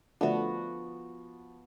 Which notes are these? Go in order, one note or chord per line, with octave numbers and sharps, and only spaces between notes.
D3 F3 A3 B3 D4 F#4